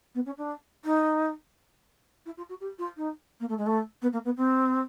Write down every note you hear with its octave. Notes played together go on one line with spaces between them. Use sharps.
B3
C#4
D4
D#4
E4
F4
F#4
G4
F4
D#4
A#3
A3
G#3
A3
B3
A#3
B3
C4